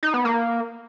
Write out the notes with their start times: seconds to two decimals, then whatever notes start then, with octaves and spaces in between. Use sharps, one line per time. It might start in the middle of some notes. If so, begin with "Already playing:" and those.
0.03 D#4
0.14 B3
0.25 A#3